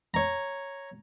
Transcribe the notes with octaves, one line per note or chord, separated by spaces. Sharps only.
C#5 A#5